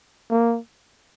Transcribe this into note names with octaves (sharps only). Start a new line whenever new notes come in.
A#3